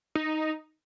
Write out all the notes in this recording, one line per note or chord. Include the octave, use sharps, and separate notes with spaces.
D#4